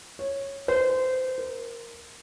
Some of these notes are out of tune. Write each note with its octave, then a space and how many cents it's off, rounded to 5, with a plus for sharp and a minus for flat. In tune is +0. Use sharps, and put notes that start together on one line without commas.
C#5 -10
C5 -25
A#4 +5